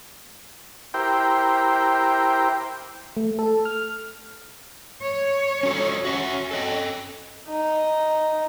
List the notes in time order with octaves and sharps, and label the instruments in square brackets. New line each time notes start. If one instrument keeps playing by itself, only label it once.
[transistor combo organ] E4 G4 A#4 C5 G5
[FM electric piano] A3
A4
F6
[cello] C#5
[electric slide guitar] C#4 F#4 A4
[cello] C#4 [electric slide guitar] F#4 E5 F#5
[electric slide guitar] A4 D#5 G5
[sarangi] D#4